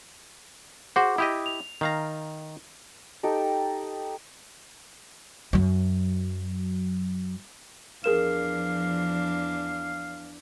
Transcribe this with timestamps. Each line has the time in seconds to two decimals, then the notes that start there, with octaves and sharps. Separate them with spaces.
0.96 F#4 G#4 C5 F#5 D6
1.18 E4 G4 D#5 D#6
1.46 F7
1.81 D#3 F5 A#5
3.23 D#4 G4 A4 G5
5.53 F#2 F#3
8.04 E2 F3 D4 G#4 A#4 F5 E7